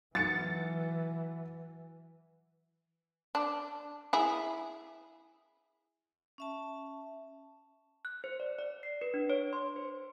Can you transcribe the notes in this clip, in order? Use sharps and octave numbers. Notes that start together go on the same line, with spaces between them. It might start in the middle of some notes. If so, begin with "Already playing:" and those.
E3 F#3 A6 C#7
D4
E4 G#4
C#4 E5 A5
F#6
C5
D5
D5
C7
B4
D4
C#5
C6
C5